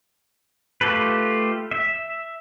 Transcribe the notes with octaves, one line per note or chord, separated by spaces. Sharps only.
A3 F4 G4 A4 B4
E5